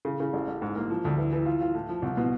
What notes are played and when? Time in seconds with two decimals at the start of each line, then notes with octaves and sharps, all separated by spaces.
0.05 C#3
0.20 C#3
0.33 A1
0.47 A1
0.62 G#2
0.76 A#3
0.90 F3
1.05 D2
1.18 E3
1.33 E3
1.46 F4
1.61 F4
1.74 A2
1.89 F3
2.02 C2
2.17 B2